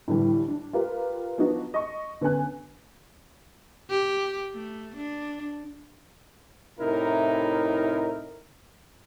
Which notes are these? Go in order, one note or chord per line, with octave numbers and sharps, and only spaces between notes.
A2 D3 E3 G3
D4
F4 G4 A#4 B4
F3 B3 D4 D#4 F#4
D#5 C#6
D3 B3 C#4 G#5 F#6
G4
A3
D4
A2 C3 D#4 E4 A#4